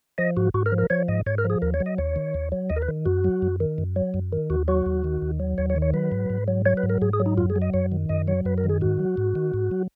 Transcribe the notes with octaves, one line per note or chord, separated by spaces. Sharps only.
F3 D#5
G#2 F#4
G#2 F#4
A#4
F3
A#4
F3 C#5
G#2 D#5
G#2 C#5
A#4
F3
G#4
D#2 A#4
C#5
F#3
D#5
D#2 C#5
D#3
D#2
F#3
D#2 D#5
A#4
B4
D#3
F#2 F#4
F#3
F#2
D#3
F#2
F#3
F#2
D#3
D#2 F#4
F#3 F#4
D#2
D#3
D#2
F#3
D#2 C#5
C#5
D#3
C#5
F#3 B4
G#2
G#2
F#3
F#3 C#5
B4
G#2
A#4
G#2 G#4
G#4
F#3
D#4
F#2 F4
G#4
F#3
D#5
F#2 C#5
D#3
F#2 D#5
F#3 C#5
F#2 B4
A#4
D#3
G#4
G#2 F#4
F#3
G#2
D#3
G#2
F#3